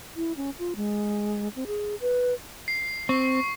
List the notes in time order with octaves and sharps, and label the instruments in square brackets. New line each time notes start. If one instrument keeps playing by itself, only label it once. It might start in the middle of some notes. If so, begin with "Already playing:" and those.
[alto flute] E4
C#4
F4
G#3
C4
G#4
B4
[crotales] C7
[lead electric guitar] C4 [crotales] C#6